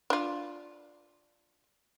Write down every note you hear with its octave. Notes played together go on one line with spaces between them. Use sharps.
D4 F4